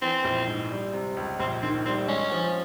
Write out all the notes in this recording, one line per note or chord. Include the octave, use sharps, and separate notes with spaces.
E3 C4
A#1
G#2
G3
C3
C#2
A#1 C4
D#3 C4
G3 C4
G#3 C#4
F3